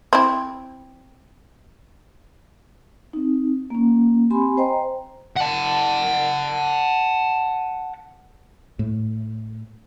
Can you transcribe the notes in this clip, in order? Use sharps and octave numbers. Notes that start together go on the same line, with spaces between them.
C4 E4
C4 D#4
A#3 C#4
C4 G4 G#5 B5 C6
C5 D#5 G5 A#5 C6
F#5 A5
A2